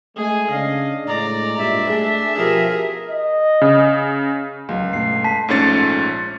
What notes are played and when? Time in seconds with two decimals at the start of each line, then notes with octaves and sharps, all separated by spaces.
0.16 G#3 A3 G#4 G#5
0.50 C#3 D4 D#5 F5
1.07 A2 G#3 D5 A#5
1.58 G2 A#2 E5
1.89 A3 D4 G#4
2.37 B2 F3 G4 G#4 A#4
3.09 D#5
3.61 C#3
4.69 D1 C#2 F#3 G#3
4.93 G2 B2 A3 C7
5.24 A5 B6
5.48 A#1 G#2 A3 C#4 A6 C#7